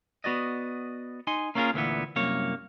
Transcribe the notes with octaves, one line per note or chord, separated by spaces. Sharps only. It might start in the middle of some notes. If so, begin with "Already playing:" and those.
B3 F#4 D5 D#5
D#4 G#5 C6
A#3 C#4 E4 F4 G#4 A#4
D2 A#2 E3 B3
C2 F#2 A#3 C#5